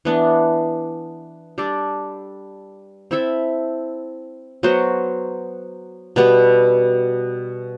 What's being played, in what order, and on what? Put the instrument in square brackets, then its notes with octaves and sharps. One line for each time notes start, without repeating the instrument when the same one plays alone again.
[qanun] E3 B3 D4
G3 D4 A4 D5
C4 E4 A4 E5
F#3 B3 F#4 C5
B2 G3 B3